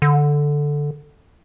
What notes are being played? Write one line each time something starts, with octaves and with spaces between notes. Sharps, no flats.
D3